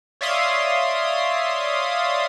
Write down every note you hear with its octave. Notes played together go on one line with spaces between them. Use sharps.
C#5 D5 E5 F5 C6 D#6